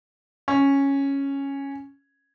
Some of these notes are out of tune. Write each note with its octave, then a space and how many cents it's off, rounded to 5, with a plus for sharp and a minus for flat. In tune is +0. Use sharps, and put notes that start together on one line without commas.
C#4 -5